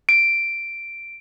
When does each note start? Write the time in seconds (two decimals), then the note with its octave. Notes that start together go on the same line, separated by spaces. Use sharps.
0.09 D7